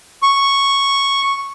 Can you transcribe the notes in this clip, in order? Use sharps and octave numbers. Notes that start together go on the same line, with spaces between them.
C#6